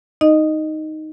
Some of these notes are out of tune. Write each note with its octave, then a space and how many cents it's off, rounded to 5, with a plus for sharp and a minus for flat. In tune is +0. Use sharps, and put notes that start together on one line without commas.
D#4 +0 D#5 -15